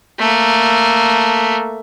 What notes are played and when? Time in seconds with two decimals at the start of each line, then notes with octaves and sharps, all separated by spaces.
0.19 A3 A#3